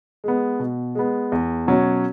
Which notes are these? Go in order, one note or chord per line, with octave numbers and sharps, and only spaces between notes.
G#3 B3
B2
G#3 B3
E2
B2 F#3 C#4